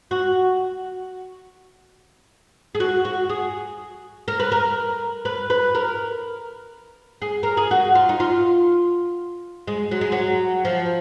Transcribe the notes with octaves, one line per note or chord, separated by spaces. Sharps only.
F#4
G#4
F#4
F#4
G#4
A#4
B4
A#4
B4
B4
A#4
G#4
A#4
G#4
F#4
F4
D#4
F4
G#3
F#3
G#3
F#3
F3